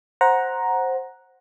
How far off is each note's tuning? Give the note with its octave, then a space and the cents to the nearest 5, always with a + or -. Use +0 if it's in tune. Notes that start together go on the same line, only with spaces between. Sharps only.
C5 +10 F#5 +0 A#5 +10